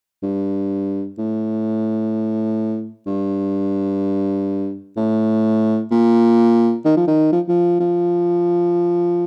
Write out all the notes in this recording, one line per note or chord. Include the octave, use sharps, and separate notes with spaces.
G2
A2
G2
A2
A#2
D#3
F3
D#3
F3
F3
F3